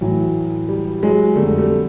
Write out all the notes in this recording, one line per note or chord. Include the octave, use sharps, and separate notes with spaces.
A2 E3 F#3
G3
F#3 G#3
F2 D3 G3 A3
G3 A3